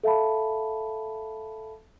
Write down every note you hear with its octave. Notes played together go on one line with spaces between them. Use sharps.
A4 E5 F5 A5 B5